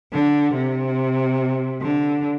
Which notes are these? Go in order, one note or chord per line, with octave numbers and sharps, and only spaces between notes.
D3
C3
D3